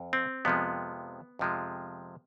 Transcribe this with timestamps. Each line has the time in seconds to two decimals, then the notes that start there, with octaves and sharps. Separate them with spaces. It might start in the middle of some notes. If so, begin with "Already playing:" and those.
Already playing: F2
0.13 C4
0.45 F2 C3 F3 G#3 B3
1.39 F2 C3 F3 G#3